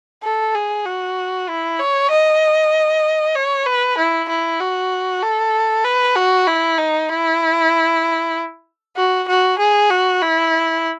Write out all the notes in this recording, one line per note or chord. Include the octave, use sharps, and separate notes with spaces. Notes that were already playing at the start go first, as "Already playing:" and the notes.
A4
G#4
F#4
E4
C#5
D#5
C#5
B4
E4
E4
F#4
A4
B4
F#4
E4
D#4
E4
F#4
F#4
G#4
F#4
E4